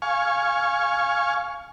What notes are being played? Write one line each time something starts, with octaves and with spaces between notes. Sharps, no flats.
F5 G#5 C#6